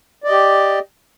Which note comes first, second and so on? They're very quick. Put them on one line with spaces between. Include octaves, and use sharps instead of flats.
D5 D#5 G4